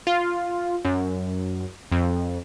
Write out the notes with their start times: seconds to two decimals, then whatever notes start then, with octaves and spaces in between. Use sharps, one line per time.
0.07 F4
0.85 F#2
1.92 F2